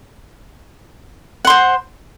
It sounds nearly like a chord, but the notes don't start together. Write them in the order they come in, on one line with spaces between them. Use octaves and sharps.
F#5 C6 C5